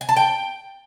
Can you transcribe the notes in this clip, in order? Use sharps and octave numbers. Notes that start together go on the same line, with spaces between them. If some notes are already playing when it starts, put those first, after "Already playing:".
G#5
A5
G5